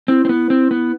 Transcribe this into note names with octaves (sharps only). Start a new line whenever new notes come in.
C4 E4
C4
B3
C4
B3